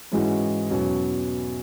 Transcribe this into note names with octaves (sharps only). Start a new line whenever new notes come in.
G#2 E3 G#3 C#4 F#4
E2 B2 F#3 C#4